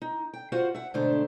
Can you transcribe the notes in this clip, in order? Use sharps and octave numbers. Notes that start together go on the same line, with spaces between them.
D#4
G5
F4 F#4 C5 F5 F#5
E5 F#5
G#2 B2 D3 A3 D4 C5